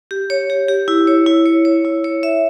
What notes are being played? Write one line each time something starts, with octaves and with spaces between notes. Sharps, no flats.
G4
C#5
G4
G4
E4
C#5
E4
C#5
C#5
E4
C#5
E5